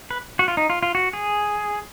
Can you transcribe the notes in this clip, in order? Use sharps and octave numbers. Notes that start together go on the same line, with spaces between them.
B4
F#4
F4
D#4
F4
F4
F#4
G#4